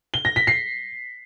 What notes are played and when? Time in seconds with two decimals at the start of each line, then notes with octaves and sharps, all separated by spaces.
0.14 G7
0.25 A#6
0.36 B6
0.47 C7